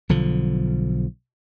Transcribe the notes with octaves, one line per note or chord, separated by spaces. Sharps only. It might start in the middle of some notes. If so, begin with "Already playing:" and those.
B1 D3 F3